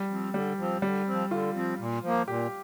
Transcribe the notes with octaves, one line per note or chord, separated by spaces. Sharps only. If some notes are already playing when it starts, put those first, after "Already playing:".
Already playing: G3
F3 C4
D3 G3
F3 C4
D3 G3
F3 C4
D3 F4
F3 C4
A#2
F3 A#3
A#2 G4